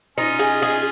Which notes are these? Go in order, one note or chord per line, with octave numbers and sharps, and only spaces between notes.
C#4 D#4 F4
G#4
G#4